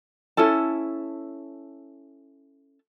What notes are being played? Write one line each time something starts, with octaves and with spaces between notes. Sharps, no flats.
C#4 E4 A4 A5